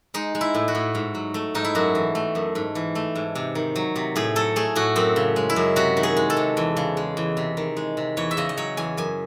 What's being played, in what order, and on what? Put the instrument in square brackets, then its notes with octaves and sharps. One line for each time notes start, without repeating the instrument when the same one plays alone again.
[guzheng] G#3 D#4
G#3
E4
A2
F#4
A2
G#2
F#3
A3
G#2 D#4
E4
F#2 F#4
E3
A3
F#2
G#2
E3
A3
G#2
C3
D#3
F#3
C3
A2 G#4
F#3 A4
A3 G#4
A2 F#4
F#2 C4
C#3
G#3
E4
F#2
C3 F#4
D#3
G#4
G#3
A4
C3
E2
C#3
G#3
E2
C3
D#3
G#3
C3
E2 C#5
E5
C#3 D#5
D#5
F#3 C#5
E2 G#5
F#2 G#5